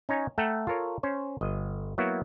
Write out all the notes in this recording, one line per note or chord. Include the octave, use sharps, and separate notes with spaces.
C#4 D#4 C#5 G#5 A#5
A3 A4 F#5 G5 A#5
F4 A4 A#4 C#5
C#4 C5 C#5
G1 D#5
F#3 A#3 B3 E4 F#4